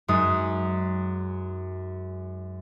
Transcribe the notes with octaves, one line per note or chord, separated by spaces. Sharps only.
F#2 G#3 D#4 D#6